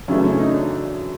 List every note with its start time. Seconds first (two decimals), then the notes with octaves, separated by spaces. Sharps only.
0.08 F#2 C#3 E3 A3 C#4 D4
0.23 C#4
0.39 D#4
0.54 D4